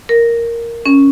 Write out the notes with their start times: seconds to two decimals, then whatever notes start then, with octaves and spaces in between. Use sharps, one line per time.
0.09 A#4
0.86 C#4